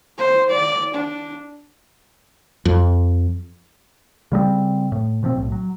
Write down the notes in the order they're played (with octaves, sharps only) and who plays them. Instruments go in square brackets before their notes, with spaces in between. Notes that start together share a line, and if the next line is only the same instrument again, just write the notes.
[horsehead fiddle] C5
D5
D4
[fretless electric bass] F2
[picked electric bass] C#3 G3 G#3 C4
A2
B2 F3 F#3 C4
B1 A2
F#3